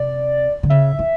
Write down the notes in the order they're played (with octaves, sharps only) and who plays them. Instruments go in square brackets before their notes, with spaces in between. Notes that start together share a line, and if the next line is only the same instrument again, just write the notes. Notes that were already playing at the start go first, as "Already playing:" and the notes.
Already playing: [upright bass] C3 [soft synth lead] D5
[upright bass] D3
[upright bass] C#3 [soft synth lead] E5
[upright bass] E3